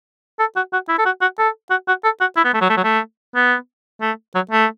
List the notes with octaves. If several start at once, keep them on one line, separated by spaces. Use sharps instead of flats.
A4
F#4
F#4
E4
A4
F#4
F#4
A4
F#4
F#4
A4
F#4
E4
B3
A3
F#3
A3
F#3
A3
B3
A3
F#3
A3